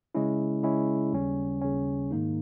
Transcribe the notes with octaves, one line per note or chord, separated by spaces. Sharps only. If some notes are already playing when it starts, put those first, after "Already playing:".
C#3 G#3 C#4 E4
C#3 G#3 C#4 E4
D#2 C#3 G3 C#4
D#2 C#3 G3 C#4
G#2 D#3 A#3 D#4